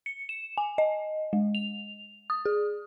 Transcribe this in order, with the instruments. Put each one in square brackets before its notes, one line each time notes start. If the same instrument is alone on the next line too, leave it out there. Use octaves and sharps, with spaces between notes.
[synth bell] C#7
E7
G#5
D#5
G#3
F7
D#6
G#4